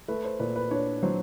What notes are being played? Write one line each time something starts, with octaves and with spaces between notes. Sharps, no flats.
A3 B4
C5
A#2 B4
B4
D4 C#5
F#3 C5